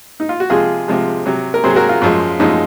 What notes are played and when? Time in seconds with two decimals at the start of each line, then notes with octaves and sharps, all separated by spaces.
0.20 D#4
0.29 F4
0.40 F#4
0.50 C3 F3 G#3 F4 G#4
0.88 C3 F3 G#3
1.26 C3 F#3
1.54 A#4
1.64 C3 F#3 G#4 C5
1.76 F#4 A#4
1.89 F4
2.01 F#2 F3 G#3
2.40 F#2 F3 G#3 D#4